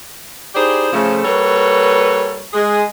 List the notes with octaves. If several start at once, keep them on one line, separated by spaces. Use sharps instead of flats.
D#4 E4 G4 G#4 C5 D5
C#3 F3 A3
G3 A#3 F#4 A4 B4 C#5
G#3 G#4